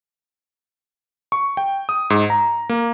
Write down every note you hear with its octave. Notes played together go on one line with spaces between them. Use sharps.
C#6
G5
D#6
G#2
A#5
A#3